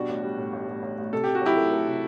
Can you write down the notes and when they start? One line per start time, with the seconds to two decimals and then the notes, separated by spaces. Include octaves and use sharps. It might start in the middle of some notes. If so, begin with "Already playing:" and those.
Already playing: B2 G3 D4 F#4
0.09 A1
0.23 G3
0.38 A2
0.53 A1
0.68 A1
0.83 A1
0.98 A1
1.12 C3 A4
1.24 C3 G4
1.35 F#4
1.42 F#3 E4 G4
1.57 A3
1.72 A3
1.87 C3